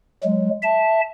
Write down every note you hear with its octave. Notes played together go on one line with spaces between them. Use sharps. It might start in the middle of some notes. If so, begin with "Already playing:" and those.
F#3 G#3
E5 A5